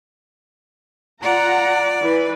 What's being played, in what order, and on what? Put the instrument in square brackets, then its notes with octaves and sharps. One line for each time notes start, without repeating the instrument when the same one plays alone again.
[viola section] F4 F#5 A#5 [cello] D5
[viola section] E3 B4